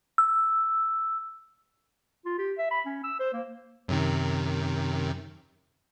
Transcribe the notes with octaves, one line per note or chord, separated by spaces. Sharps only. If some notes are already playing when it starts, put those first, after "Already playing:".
E6
F4
G4
E5
B5
C#4
E6
C5
A#3
F#2 C3 D#3